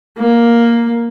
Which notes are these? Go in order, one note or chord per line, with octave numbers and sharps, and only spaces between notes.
A#3